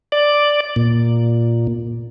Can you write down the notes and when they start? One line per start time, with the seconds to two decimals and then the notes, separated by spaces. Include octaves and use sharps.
0.12 D5
0.76 A#2